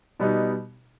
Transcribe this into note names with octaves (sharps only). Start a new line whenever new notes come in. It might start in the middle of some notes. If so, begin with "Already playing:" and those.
B2 G3 B3 D#4